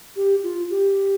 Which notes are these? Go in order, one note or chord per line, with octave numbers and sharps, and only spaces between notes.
G4
F4
G4